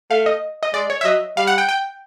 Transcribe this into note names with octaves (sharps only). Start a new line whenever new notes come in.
A3 F5
D#5
D#5
G#3 D5
C#5
E5
F#3 D#5
G3 F5
F#5
G5
G5